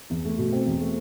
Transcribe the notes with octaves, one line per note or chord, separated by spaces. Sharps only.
E2
A3
B2
C4
E2
A3